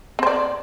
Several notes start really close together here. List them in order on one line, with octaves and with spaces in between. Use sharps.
C4 C5 D5